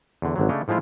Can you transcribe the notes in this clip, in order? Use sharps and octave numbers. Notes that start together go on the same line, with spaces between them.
E2 D3
G#1 D3 F#3
C#3 A3 D4 C#5 D#5
A2 F3 G#3 E4 F4